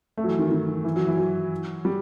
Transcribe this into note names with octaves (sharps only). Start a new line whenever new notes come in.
A3
F#3
E3
D#3
D#3
E3
F#3
E3
F#3
G3